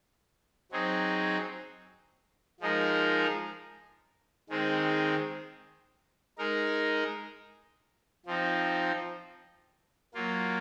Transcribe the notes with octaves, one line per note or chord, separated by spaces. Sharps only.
F#3 C4 D#4 G#4
F3 G#3 D#4 A#4
D#3 G#3 C4
G#3 D#4 A#4
F3 C4 D#4
F#3 A#3 F4